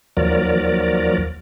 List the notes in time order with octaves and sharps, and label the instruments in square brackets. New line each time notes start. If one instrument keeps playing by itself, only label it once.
[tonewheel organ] D#2 F3 F#3 A#4 D5